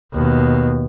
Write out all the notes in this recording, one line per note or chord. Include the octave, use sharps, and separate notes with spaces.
D#2 B2